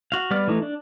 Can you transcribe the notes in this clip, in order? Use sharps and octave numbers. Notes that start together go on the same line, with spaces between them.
F#4 F5
G3 B3 D5 D6 F6
E3 A3 D#4
D4